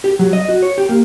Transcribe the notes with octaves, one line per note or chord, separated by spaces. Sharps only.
G4
F#3
D#5
F#4
C#5
G4
A#3